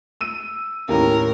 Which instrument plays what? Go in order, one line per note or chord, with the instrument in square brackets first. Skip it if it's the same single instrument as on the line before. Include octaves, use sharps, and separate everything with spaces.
[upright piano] E6 D#7
[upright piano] D#2 A2 C#4 [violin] A#4